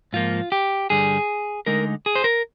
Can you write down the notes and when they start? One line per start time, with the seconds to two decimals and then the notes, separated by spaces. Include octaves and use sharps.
0.13 G#2 F3 A#3 F4
0.52 G4
0.90 G2 D3 G3 G#4
1.66 D2 D3 G#3 D#4 A#4
2.06 G#4
2.15 C5
2.24 A#4